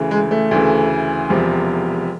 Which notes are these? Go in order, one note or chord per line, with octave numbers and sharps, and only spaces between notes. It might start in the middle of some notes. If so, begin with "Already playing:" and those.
Already playing: D2 C#3 E3
G#3
A3
D2 C#3 E3
E1 E2 C3 F3